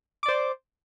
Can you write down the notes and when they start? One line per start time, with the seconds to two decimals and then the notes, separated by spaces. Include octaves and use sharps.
0.23 D6
0.26 D5
0.28 C5